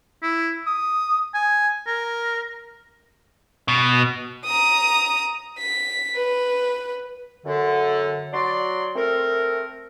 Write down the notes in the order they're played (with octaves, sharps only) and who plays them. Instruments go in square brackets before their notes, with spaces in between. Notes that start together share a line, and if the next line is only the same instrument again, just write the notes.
[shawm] E4
D#6
G#5
A#4
[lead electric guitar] B2
[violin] A#5 D#6
B6
B4
[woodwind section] F#2 D3
F#3 D5 C6
A3 C4 A#4